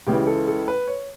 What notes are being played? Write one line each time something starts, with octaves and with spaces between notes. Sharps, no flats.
C#2 C#3 E3 G4
A4
A4
B4
C#5